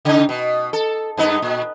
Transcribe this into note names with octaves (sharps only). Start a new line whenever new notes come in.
C#3 D#4
B2
A4
G2 B3 D#4
A#2